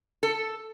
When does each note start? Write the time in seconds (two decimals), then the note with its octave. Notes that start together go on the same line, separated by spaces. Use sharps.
0.23 A4